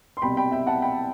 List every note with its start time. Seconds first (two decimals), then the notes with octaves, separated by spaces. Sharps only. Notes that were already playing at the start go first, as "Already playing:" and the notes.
0.17 C6
0.22 C2 B2 G5 B5
0.37 G5 B5
0.51 E5 G5
0.67 F#5 A5
0.82 G5 B5